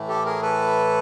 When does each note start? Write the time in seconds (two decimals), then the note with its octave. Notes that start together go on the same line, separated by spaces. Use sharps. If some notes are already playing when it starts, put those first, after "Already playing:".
Already playing: A2 E3 A3
0.08 G4 A4
0.25 G#4 A#4
0.42 A4 B4